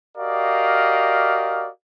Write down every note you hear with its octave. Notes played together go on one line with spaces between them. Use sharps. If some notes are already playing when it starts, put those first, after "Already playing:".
F#4 G4 A#4 D5 D#5 F5